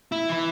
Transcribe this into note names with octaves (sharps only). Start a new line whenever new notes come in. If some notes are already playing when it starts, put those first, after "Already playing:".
E4
E3